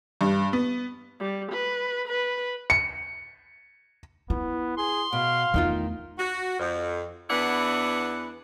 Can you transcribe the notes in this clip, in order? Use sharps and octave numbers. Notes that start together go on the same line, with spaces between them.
G2
B3
G3
B4
B4
C#7
B3 E4
G#4 C6
B2 F5
E2 D#3 A3 D#4 F4
F#4
F2
E2 E3 B3 D4 E4 F#5